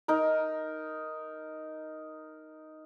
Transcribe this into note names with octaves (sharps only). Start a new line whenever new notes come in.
D#4 A#4